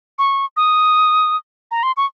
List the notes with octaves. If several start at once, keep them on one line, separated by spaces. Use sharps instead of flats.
C#6
D#6
A#5
C6
C#6